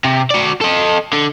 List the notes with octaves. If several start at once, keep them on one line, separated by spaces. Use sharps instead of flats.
C3
F#4 D5
A4 D#5
D3